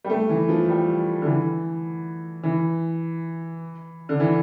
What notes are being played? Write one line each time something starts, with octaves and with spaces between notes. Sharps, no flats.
G3
A3
E3
F3
G3
D3
E3
E3
D3
E3